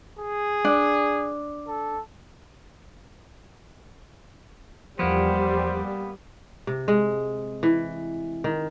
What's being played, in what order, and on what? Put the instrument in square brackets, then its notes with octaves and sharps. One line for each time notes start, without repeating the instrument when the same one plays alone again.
[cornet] G#4
[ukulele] D4
[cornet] A4
[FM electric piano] E2 F3 [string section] G3 [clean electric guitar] A#3 B3 [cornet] C5
[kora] C3
G#3
E3
D#3